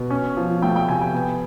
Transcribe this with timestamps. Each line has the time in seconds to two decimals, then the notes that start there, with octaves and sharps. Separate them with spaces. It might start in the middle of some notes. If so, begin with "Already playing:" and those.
Already playing: B2
0.10 C#4
0.37 F3
0.62 A3 G5
0.76 G5
0.89 C3 G#5
1.01 G5
1.14 B3